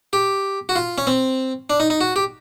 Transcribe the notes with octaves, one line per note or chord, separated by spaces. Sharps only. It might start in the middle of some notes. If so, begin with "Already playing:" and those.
G4
F#4
F4
C#4
C4
D4
D#4
D#4
F#4
G4